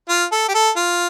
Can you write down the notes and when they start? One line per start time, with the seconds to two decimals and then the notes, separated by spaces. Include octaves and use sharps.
0.09 F4
0.32 A4
0.48 G4
0.54 A4
0.76 F4